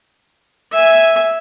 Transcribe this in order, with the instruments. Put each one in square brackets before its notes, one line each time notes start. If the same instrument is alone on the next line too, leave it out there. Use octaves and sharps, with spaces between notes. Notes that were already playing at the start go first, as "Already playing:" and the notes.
[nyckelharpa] E5 G#5